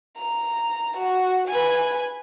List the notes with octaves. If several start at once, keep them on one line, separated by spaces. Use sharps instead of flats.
A#5
F#4
B4 G#5